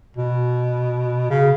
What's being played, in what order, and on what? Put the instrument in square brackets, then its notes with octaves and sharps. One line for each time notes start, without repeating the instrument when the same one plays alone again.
[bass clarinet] B2
C#3